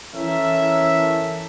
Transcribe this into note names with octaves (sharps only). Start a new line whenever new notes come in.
E3 C#4 A4 A#4 E5